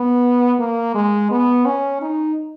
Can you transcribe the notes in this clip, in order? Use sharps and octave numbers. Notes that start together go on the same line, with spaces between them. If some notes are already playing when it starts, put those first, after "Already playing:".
Already playing: B3
A#3
G#3
B3
C#4
D#4